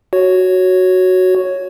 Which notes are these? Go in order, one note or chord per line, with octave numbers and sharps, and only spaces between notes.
F#4 C#5